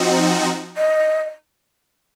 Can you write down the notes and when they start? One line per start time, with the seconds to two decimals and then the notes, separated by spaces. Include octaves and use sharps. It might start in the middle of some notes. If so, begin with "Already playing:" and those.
Already playing: F3 C4 D#4 F#4
0.77 D#5